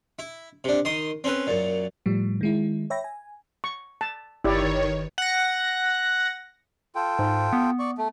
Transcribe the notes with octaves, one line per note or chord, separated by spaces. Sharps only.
E4
C3 D4
D#3 C6 D#6
C4 C#4 A4 B4
F#2 A#2
A2 F3 G3
D#3 G#3 E4
C#5 E5 G5 B5 A#6
G#5
C#6
A5
G1 D#3 E4 G4 B4 C#5 D5 A6
F#5 A#6
F4 A4 G5
G#2
B3
D5 C#6
A3